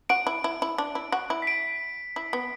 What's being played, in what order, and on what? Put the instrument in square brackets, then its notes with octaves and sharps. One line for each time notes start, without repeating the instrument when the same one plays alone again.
[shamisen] F#4 [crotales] D7
[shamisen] E4
E4
E4
D4
E4
F#4
E4
[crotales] B6
D7
[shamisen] E4
B3